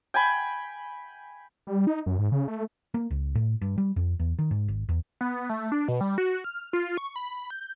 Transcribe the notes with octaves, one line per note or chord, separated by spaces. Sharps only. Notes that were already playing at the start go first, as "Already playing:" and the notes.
G5 G#5 B5
G3
D#4
F#2
G#2
C#3
A3
A#3
C#2
A2
G2
G3
F2
E2
D#3
G#2
G#1
E2
B3
A3
D4
B2
G3
F#4
F6
F4
C#6
B5
G6